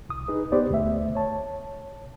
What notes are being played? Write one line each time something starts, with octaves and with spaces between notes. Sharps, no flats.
C2 D#6
D#4 G#4 B4
B3 G4 B4 C5 D5
D2 A3 E5
C#5 A5